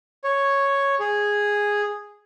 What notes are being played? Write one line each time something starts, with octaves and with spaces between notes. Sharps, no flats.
C#5
G#4